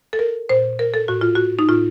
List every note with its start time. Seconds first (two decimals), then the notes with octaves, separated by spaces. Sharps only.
0.13 A4
0.19 A#4
0.49 A#2 C5
0.79 A#4
0.94 A4
1.08 A2 F#4
1.21 F4
1.35 F#4
1.59 D#4
1.69 A2 F4